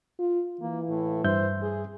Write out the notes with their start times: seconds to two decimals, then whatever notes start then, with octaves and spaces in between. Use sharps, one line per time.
0.19 F4
0.61 E3 A#3
0.89 A2
1.24 G2 C5 E5 G6
1.62 G#4